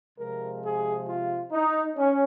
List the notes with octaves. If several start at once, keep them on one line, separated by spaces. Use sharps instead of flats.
C3 F3 G#3 A#4
G#4
F4
D#4
C#4